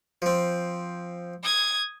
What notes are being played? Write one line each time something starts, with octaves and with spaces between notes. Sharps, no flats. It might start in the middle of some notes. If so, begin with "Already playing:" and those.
F3 C4
D#6 G#6